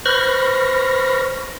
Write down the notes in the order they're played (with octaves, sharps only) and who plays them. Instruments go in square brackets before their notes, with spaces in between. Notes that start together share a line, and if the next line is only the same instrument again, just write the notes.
[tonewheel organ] B4 C5 B5 C#6 F6 A#6